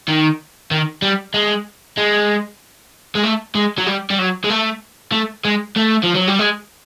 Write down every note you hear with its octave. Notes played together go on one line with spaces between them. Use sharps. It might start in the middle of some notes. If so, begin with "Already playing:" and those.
D#3
D#3
G3
G#3
G#3
G#3
A3
G#3
F#3
G3
G3
F#3
G#3
A3
A3
G#3
A3
F3
F#3
G3
G#3